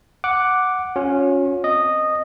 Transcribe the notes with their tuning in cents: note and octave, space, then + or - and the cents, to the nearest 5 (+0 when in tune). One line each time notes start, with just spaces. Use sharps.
F#5 +0 D6 +0
C#4 +0 F4 +45
C4 -10 D#5 -10